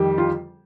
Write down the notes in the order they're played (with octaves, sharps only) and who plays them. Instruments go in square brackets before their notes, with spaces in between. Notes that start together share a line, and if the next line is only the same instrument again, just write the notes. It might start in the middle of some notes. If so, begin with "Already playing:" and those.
Already playing: [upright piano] F2 D#3 G3 G4
F4